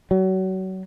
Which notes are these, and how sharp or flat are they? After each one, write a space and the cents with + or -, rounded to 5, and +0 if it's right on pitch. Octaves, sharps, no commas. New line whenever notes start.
F#3 +30